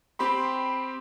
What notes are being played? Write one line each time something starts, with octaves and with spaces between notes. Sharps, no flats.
C4 G4 B5 C6